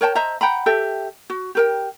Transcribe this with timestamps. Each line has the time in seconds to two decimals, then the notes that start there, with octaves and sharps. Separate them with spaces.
0.01 A#4 C#5 G5 A5
0.15 C5 D#5 E5 A#5
0.41 F#5 G5 A#5 B5
0.66 G4 A4 E5 G5
1.30 F#4
1.55 G4 A#4 G5